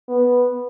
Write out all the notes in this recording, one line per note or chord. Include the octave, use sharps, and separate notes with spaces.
B3